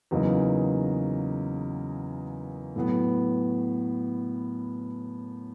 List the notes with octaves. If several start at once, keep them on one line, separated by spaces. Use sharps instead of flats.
E2 C#3 F#3 A#3 D#4
A2 F#3 B3